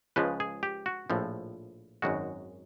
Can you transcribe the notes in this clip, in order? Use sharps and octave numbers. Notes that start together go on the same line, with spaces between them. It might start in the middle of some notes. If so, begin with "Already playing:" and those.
C#2 C#3 F3 G#3 B4
G#4
G4
F#4
A#1 A2 F3
G#1 F#2 D#3 G#3 F#4